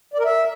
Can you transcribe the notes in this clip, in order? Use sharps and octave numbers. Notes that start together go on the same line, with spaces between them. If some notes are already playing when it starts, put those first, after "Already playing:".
D5
A#4
E5